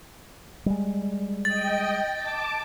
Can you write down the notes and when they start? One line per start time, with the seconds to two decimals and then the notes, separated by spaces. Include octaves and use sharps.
0.66 G3 G#3
1.45 D#5 G5 A6
2.14 A5 D6